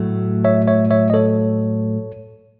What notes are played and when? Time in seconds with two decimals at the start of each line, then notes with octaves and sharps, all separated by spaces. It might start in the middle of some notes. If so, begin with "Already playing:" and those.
Already playing: A2 F#3 A3
0.45 C#5 E5
0.68 C#5 E5
0.91 C#5 E5
1.10 D#5
1.14 A4 C#5